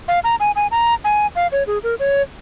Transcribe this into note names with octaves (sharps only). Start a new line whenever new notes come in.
F5
A#5
G#5
G#5
A#5
G#5
F5
C#5
G#4
A#4
C#5